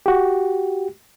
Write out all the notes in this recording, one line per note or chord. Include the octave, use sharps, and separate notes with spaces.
F#4 G4